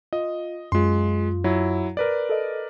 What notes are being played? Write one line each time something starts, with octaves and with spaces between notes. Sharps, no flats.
F4 D#5
F#2 G#3 F4 C6
F#3 E4
A#4 B4 D5
A4 D#5